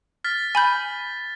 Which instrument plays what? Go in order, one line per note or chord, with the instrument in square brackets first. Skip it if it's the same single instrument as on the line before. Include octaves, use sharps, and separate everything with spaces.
[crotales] F6 A6 B6
[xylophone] G#5 B5 G6